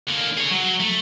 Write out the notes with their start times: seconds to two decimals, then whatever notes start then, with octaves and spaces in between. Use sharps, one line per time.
0.09 D3 A#3
0.38 G#4 C#5
0.51 F#3
0.80 A3